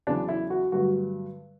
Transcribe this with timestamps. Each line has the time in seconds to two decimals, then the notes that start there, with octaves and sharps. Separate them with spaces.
0.07 E2 C#3 F#3 D4
0.29 E4
0.50 F#4
0.72 G2 D3 F#3 A3 F#4